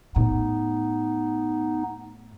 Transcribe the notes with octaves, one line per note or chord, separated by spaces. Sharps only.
A2 B3 D#4